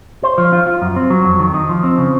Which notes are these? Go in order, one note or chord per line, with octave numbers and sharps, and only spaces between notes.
C5
F3
F4
F4
F#2
C4
F#3
F2
D#3
D#4
F3
C4
C#3